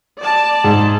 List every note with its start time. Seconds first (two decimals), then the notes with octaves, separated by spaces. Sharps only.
0.21 D5 A5
0.64 G#2